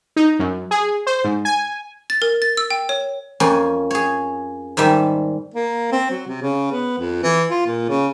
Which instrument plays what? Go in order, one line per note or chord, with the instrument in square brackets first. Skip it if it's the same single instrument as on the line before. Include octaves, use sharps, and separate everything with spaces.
[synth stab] D#4
F#2
G#4
C5
G#2
G#5
[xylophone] A6
A#4
A6
E6
G5
C#5
[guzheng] F2 A#3 C#4 G#5
G#4 C#5
G#2 D#3 G3 E5 A5
[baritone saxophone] A#3
C4
F#3
C3
C#3
B3
F2
E3
F4
A#2
C#3